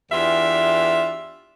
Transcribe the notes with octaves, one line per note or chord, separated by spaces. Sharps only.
E2 E3 D4 F4 G4 E5